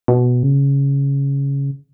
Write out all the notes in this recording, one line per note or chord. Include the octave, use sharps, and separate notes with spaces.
B2
C#3